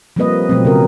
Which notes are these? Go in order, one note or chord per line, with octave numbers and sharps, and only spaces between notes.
F3 G3 A#3 C4 B4 D#5
B2 F3 F#3 A3 C4
C#3 C#4 A#4